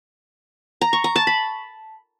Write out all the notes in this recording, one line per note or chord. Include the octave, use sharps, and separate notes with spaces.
A#5
C#6
A#5
A5
B5